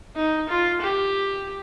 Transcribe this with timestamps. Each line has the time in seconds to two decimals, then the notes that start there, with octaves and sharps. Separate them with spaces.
0.16 D#4
0.49 F4
0.81 G4